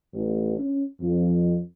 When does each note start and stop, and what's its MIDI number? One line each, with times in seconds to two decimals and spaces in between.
0.13 0.53 33
0.58 0.84 61
1.01 1.57 41